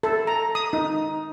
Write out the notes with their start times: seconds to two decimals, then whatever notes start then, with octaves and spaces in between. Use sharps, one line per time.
0.03 A4
0.27 A#5
0.55 D#6
0.73 D#4